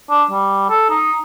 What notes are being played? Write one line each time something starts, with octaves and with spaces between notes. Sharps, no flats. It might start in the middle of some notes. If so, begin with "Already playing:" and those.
D4
G3
A4
D#4